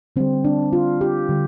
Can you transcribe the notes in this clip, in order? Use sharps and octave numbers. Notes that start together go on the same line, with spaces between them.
D3 G3 C4
D4
F4
G4
D3 G3